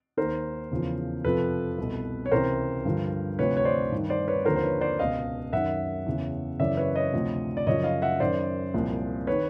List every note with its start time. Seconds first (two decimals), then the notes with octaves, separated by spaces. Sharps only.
0.17 D#2 D#3 A#4 C5
0.71 E2 C#3 F3
1.25 F2 C3 F3 A4 B4
1.78 C2 B2
2.26 C#5
2.32 C#2 C3 E3 A#4 C5
2.85 G2 D3 F3
3.39 D2 C3 F3 B4 C#5
3.57 C#5
3.65 C5 D5
3.92 G2 D#3
4.10 C5 D5
4.28 B4 C#5
4.45 D#2 D3 F3 A#4 C5
4.56 C5
4.63 B4 C#5
4.81 C5 D5
4.99 C#2 B2 D#5 F5
5.53 F#2 D#3 E5 F#5
6.06 E2 C#3 E3
6.60 F#2 C#3 E3 D5 E5
6.77 B4 C#5
6.95 C#5 D#5
7.13 D2 C3 F3
7.57 D5
7.67 F#2 C#3 F3 C#5 D#5
7.84 D#5 F5
8.02 E5 F#5
8.20 F#2 D#3 C5 D5
8.74 C2 A#2 F3
9.27 D#3 B4 C#5